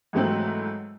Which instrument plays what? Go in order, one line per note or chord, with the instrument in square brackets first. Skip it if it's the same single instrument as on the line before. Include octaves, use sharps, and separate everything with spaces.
[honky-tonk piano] G#2 E3 F#3 A3 C4 F#7